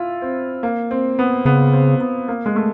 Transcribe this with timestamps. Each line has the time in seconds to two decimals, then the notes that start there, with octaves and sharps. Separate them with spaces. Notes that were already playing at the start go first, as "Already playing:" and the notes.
Already playing: E4 F4
0.22 C4
0.63 A#3
0.91 C4
1.19 B3
1.45 C#3 B3
1.73 C4
2.01 B3
2.28 A#3
2.46 G#3
2.56 A3